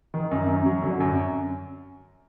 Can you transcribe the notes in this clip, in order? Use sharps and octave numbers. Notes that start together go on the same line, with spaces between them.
D#3
F#2
F#2
F#3
D3
F#2